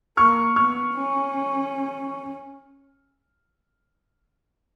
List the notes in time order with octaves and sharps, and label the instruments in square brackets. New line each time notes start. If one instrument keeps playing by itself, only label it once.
[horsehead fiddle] A#3 [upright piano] C#6 F6
[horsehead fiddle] B3 [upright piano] C#6 F6
[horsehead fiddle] C#4